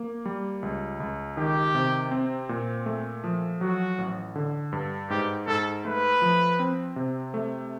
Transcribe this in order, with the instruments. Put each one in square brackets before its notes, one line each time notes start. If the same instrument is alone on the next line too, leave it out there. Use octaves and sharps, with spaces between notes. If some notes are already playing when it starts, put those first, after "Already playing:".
Already playing: [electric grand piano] A#3
G3
C#2
C#2
[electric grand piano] D#3 [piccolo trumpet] G4
[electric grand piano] C3
C4
A#2
A3
F3
[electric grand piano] F#3 [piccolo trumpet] F#4
[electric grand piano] A1
D3
G2
[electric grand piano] G#2 [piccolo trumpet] G4
[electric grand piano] G#2 [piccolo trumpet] A4
[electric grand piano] A3 [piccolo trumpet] B4
[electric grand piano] F3
C4
C3
A3